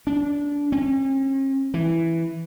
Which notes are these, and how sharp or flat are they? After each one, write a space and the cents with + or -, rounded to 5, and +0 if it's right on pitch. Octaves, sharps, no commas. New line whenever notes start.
D4 -20
C#4 -45
E3 +5